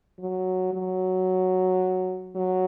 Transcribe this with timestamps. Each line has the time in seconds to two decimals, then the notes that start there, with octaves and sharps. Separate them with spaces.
0.20 F#3
0.73 F#3
2.35 F#3